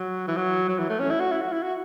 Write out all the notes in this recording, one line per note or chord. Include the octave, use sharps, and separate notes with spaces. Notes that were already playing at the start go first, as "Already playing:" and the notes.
Already playing: F#3
E3
F#3
F#3
E3
A3
C#4
E4
F#4
E4
F#4
E4
F#4